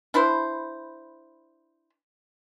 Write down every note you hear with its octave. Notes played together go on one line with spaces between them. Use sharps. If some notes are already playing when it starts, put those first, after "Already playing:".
D4 E4 B4 C5